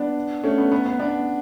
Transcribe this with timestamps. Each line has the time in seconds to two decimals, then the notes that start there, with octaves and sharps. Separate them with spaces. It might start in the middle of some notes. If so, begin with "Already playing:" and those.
Already playing: B3 D4
0.44 A3 C#4
0.58 B3
0.72 B3
0.86 B3
0.99 B3 D4